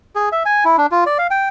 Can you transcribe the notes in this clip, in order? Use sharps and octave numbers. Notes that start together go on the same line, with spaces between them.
G#4
E5
G#5
E4
D4
F4
D5
F5
G5